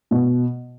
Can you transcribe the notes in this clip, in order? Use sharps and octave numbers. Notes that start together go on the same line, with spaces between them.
B2